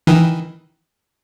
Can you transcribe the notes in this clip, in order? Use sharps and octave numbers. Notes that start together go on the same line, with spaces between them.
D#3 E3